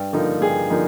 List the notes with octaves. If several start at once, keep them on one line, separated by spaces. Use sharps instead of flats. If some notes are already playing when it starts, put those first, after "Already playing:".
Already playing: G2
D3 F3 A#3 D#4
G2 G#4
D3 F3 A#3 D#4